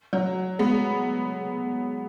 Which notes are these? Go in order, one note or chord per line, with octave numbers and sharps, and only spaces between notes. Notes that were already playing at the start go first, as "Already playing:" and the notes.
F#3
G#3 B3